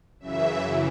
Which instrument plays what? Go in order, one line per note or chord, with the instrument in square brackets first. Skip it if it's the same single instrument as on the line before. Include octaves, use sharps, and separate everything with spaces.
[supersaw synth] F#2 C#3 E3 E5